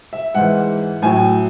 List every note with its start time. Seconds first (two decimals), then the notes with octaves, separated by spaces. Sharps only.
0.13 E5
0.35 G#2 E3 F#5
1.02 A2 F#3 G#5